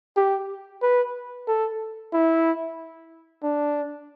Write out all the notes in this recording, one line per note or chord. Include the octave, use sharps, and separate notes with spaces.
G4
B4
A4
E4
D4